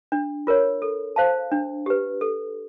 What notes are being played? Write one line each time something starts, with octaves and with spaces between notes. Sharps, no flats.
D4
F4 A#4 C#5
A4
C5 F5 A5
D4
G4 B4
A4